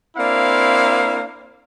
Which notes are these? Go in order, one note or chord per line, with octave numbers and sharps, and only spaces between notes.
A#3 C4 D4 E4 F5